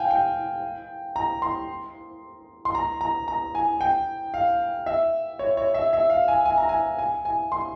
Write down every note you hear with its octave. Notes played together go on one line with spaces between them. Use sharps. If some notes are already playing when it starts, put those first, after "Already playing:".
Already playing: F5 G5 G#5
G5
A#5
C6
C6
A#5
A#5
A#5
G#5
G5
F5
E5
C#5
C#5
E5
E5
F5
G#5
G#5
A#5
G#5
G#5
G#5
C6